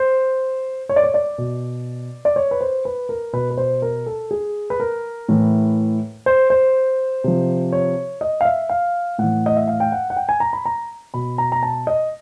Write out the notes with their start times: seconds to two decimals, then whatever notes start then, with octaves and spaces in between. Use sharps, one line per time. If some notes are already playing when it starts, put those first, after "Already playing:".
Already playing: C5
0.89 C#5
0.96 D5
1.03 C#5
1.14 D5
1.38 B2
2.25 D5
2.36 C#5
2.51 B4
2.61 C5
2.85 B4
3.09 A#4
3.33 B2 B4
3.50 B4
3.58 C5
3.82 A#4
4.06 A4
4.31 G#4
4.70 B4
4.80 A#4
5.29 A2 E3
6.26 C5
6.50 C5
7.24 C3 F3
7.72 C#5
8.21 D#5
8.41 F5
8.45 E5
8.69 F5
9.18 A2 E3 F#5
9.46 D#5
9.57 E5
9.68 F5
9.80 G5
9.92 F#5
10.10 F#5
10.17 G5
10.29 G#5
10.40 A#5
10.53 B5
10.65 A#5
11.14 B2 B5
11.38 A#5
11.52 A#5
11.63 A5
11.87 D#5